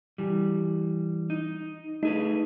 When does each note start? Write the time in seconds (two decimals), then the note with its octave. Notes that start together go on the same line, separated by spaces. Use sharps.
0.18 E3 G3
1.30 D#4
2.03 A3 D#4 G#4 B4